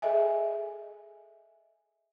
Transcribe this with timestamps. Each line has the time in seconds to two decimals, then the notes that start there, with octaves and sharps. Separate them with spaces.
0.02 G#4 A4 D#5 E5 G#5